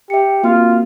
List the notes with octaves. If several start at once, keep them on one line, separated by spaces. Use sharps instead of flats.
G4 E5 C#7
A#3 C4 F4 F#4